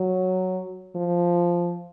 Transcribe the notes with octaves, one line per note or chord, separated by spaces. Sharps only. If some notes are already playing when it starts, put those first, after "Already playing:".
Already playing: F#3
F3